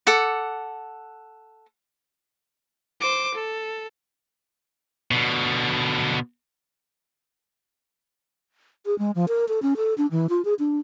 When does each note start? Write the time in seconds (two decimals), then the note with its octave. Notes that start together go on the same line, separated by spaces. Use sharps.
0.07 A4 F#5 D6
3.01 C5 D6
3.34 A4
5.11 B2 D3
8.86 G#4
8.99 G#3
9.15 F3
9.28 A#4
9.48 A4
9.62 C#4
9.77 A4
9.98 D4
10.11 E3
10.29 F4
10.45 G#4
10.59 D4